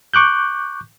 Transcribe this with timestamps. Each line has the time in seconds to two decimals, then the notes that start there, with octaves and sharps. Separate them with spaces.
0.14 C#6 D6 F#6 G6